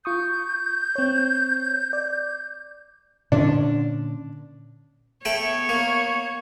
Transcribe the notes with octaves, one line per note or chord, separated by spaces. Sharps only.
F4 C#6 D#6 G6
C4 C#5
D5
A#2 D3 C#4 D4
A3 B3 C#5 G5 B5
A#3